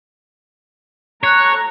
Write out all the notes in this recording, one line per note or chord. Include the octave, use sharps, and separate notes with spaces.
A4 C#5 A#5 F#6